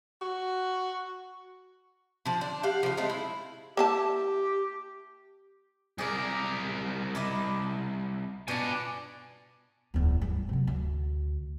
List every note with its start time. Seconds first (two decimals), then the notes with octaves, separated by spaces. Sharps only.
0.22 F#4
2.26 D3 F3
2.41 D4
2.63 G4 F5 F#5
2.83 C#3 F3
2.97 G#3 A3 C4 F4
3.10 E4
3.77 A#3 E4 G4 A5
5.98 C2 G#4 A#4 D5
7.15 E4 D5 D#5
8.48 B2 D4 D5 G#5
9.94 D1 E2
10.21 G2
10.49 C3 F#3
10.67 D2